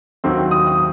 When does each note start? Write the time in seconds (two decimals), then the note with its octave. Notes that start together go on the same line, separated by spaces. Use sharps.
0.24 D#2 D#3 F#3 C4
0.51 D#6
0.67 D#6